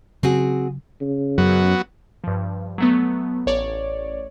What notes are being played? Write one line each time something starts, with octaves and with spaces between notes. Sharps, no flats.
C#3 F#3 C4 F#4 G#4
C#3
F#2 F#3 B3 F#4
G2 F3
F#3 A3 B3
A1 C#5 D5